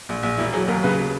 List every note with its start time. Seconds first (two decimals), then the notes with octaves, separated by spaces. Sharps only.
0.09 A#1
0.23 A#1
0.38 E1 E4
0.53 F#3 G#4
0.68 D#2 A#4
0.83 C#3 B4